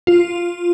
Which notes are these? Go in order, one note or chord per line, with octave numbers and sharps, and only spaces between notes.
F4